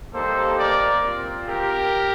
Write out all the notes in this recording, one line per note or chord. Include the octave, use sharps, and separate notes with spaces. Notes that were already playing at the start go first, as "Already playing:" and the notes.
G3 A#3 D#4 G4 A4 C5
A#4 D5
C4 F4
G4 A#4